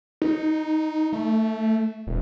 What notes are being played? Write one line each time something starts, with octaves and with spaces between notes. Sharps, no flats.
D#4
A3
E1